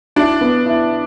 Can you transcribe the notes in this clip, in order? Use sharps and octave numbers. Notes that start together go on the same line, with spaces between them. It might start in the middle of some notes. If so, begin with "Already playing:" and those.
D4 E4
B3
E4